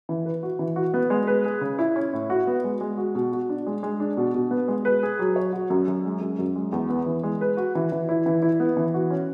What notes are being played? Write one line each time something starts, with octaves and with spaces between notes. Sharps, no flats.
E3
B4
F#4
E3
F#4
B3
G#3
B4
G#4
C#3
E4
C#4
A2
F#4
B3
G#3
G#3
F#4
B2
F#4
D4
G#3
G#3
D4
B2
B2
B3
G#3
B4
G#4
F#3
C#5
F#4
F#2
F#2
G#3
F#2
F#2
G#3
E2
B3
E3
G#3
B4
F#4
E3
E3
E4
E3
E4
B3
E3
F#4
C#4